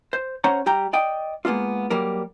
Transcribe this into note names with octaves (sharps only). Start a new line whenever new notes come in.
C5
C#4 C5 C#5 F#5 A#5
G3 G4 G5 A#5
D5 D#5 G5
G#3 A#3 B3 D4 F4
F#3 G3 A#3 A#4